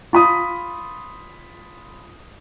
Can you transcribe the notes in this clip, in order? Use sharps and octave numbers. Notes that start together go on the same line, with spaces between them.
F4 B5 D#6